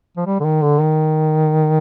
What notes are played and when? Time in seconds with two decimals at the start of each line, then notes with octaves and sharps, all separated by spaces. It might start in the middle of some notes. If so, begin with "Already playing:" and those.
0.17 F3
0.26 G3
0.40 D3
0.45 D#3
0.62 D3
0.79 D#3